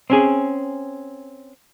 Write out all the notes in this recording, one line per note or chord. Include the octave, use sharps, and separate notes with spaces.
C4 C#4 G#4